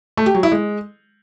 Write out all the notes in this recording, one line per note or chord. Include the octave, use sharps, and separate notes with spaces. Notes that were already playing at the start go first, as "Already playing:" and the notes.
A3
G4
F#3
E4
G#3